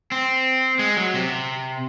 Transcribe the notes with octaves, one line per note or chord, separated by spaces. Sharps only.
C4
G#3
F#3
C3